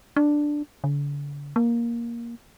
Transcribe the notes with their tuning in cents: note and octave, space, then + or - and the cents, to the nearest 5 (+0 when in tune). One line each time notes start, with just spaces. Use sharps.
D4 +5
D3 -40
A#3 +10